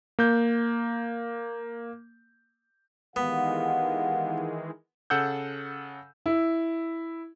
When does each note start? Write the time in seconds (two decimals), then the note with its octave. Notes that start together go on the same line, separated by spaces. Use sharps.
0.19 A#3 G6
3.16 D#3 E3 G#3 B3 G4 F5 F#5
5.10 C#3 A4 F#5 E6 G6
6.26 E4